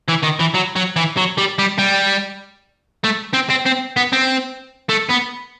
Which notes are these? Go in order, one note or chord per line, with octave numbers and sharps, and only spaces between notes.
E3
D#3
E3
F#3
F#3
E3
F#3
G3
G3
G3
A3
C4
C4
C4
B3
C4
A3
B3